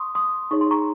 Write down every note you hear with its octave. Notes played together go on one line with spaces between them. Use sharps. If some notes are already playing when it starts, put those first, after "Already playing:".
Already playing: C6 C#6 D#6
C6 D#6
D#4 G#4 C#5 C#6
C6
A#5 C#6